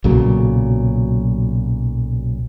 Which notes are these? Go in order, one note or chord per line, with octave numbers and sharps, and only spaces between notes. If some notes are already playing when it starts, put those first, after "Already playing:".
B1 A#2 C#3 F#3